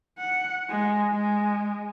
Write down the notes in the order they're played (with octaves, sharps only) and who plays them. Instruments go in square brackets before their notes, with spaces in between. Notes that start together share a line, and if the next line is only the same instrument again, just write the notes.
[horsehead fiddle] F#5
G#3
G#3